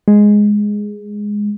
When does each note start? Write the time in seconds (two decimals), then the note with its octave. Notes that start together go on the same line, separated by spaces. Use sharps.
0.08 G#3